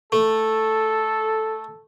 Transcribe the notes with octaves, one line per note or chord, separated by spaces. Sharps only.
A3 A4